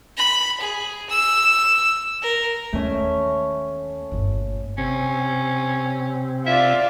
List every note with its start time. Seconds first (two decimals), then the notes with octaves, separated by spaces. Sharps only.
0.17 B5
0.60 G#4
1.09 E6
2.22 A#4
2.73 D#2 A3 C#4
4.11 G1 A#2
4.78 C3 C4 C#4
6.47 F4 D5 E5